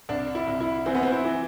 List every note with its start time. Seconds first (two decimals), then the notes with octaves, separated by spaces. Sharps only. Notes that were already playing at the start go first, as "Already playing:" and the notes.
0.09 C2 D4
0.35 E4
0.48 C2
0.60 E4
0.86 E3 C4
0.95 B3
1.03 C4
1.12 E4
1.25 E3